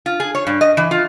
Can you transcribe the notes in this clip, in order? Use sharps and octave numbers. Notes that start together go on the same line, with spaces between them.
F4
G#4
C#5
G2
D#5
E3
F4